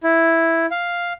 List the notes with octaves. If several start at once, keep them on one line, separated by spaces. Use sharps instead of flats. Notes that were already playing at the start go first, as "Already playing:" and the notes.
E4
F5